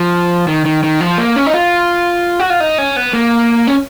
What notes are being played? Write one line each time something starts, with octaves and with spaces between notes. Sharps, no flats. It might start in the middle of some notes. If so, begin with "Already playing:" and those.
Already playing: F3
D#3
D#3
D#3
F3
A#3
C#4
D#4
F4
F#4
F4
D#4
C#4
B3
A#3
C#4